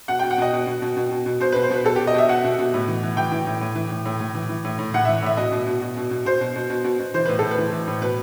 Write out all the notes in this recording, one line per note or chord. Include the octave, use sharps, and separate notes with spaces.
B2 F#5
G5
B2
F#5
B2 D#5
B2
B2
B2
B2
B2
B2
B2 C5
B4
B2
C5
B2 B4
B2 A4
G4
B2
D#5
B2 E5
B2 F#5
B2
B2
A2
E3
E3
E3 G5
E3
A2
A2
E3
A2
A2
A2
E3
E3
A2
A2
A2 F#5
E5
E3
A2 E5
B2 D#5
B2
B2
B2
B2
B2
B2 C5
B2
B2
B2
B2
B2
E3 C5
A2 B4
A2 A4
B4
E3
E3
A2
B2 B4